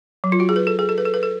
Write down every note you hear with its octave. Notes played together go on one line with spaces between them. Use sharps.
F#3
F4
F#4
G#4
B4
A4
G#4
A4
B4
A4
B4
A4